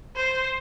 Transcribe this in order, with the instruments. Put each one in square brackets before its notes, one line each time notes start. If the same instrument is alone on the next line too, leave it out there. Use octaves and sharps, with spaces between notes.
[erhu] C5